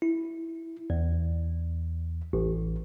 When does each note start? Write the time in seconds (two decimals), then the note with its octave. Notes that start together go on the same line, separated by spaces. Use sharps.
0.02 E4
0.90 E2
2.33 A1